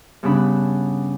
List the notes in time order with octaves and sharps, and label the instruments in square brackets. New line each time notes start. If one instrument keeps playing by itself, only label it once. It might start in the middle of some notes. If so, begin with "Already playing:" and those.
[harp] G2 C#3 B3 D4 F#5 B5